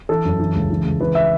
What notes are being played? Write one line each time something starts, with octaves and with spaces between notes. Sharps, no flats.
E3 A4
F#2
E3
C#2
E3
C#2
E3 B4
E5